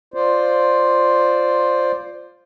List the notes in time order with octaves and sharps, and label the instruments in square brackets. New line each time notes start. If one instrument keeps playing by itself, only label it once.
[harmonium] F4 C5 D5